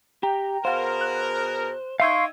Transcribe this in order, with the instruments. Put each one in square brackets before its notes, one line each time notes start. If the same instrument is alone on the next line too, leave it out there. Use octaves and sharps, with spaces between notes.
[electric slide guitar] G4 [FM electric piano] G5 A#5
[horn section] B2 G#4 A#4 [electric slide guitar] C5 [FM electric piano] F5 F#5
[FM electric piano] F#6
[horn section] D#4 G5 [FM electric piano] E5 E6 G#6 [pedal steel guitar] F5 C6 C#6